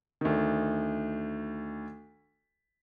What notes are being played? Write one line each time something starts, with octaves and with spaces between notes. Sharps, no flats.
D2 D#3